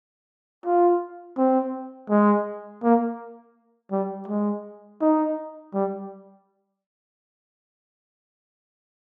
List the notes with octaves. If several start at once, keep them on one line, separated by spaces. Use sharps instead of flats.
F4
C4
G#3
A#3
G3
G#3
D#4
G3